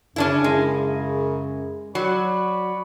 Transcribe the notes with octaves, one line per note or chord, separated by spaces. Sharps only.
F#2 C#3 C#4 D4 E4
G#3
F#3 D5 B5 C#6